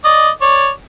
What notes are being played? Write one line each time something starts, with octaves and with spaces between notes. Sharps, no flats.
D5 D#5
C#5 D5